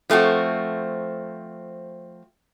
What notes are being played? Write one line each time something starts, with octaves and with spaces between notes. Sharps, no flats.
F3 A3 C4 F#4